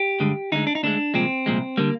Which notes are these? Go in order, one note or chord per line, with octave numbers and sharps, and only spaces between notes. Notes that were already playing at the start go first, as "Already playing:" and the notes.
Already playing: G4
G2 D3 G#3
D2 D3 G#3 D#4
D4
D#4
D2 D3 G#3 D4
C2 A#2 F3 G#3 C4
C2 A#2 F3 G#3
D3 G3 A#3